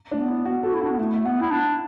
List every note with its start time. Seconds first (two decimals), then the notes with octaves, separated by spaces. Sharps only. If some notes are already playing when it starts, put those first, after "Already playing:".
0.11 A3 D4
0.19 B3
0.28 E4
0.45 B3 F#4
0.63 F#4 A4
0.74 E4
0.81 D4 F#4
0.91 B3
0.98 A3 E4
1.14 E5
1.25 B3 F#5
1.41 E4
1.51 D4